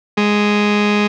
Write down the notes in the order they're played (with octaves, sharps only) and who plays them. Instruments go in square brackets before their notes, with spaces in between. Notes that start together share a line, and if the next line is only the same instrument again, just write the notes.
[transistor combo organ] G#3